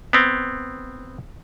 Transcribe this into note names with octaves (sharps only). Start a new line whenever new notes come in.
B3 C4